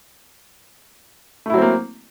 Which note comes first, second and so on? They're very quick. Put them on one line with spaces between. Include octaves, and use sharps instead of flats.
A3 E4 F#3 C4 A#3